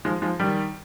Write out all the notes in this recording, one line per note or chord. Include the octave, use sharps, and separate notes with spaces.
F3 G#3
F3 G#3
D#3 G3